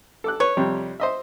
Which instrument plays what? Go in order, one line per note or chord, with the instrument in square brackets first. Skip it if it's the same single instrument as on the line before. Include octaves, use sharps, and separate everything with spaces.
[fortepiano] A4 D6 F#6
[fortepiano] B4 [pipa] C#5
[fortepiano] F2 C3 G3
C5 D#5 E5